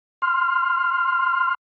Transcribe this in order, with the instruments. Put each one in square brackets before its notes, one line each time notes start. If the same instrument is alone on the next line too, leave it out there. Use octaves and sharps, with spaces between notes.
[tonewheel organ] C6 F6